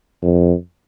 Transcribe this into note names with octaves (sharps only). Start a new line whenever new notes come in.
F2